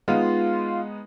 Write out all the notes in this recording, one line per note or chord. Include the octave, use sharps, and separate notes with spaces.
G#3 B3 D#4 F4